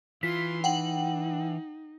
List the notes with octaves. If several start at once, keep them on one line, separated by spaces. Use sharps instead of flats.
E3 F4 C6 B6
D#4 F#5 G5 F#7